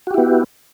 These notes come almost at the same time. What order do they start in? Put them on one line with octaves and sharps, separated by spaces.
F#4 G4 E4 B3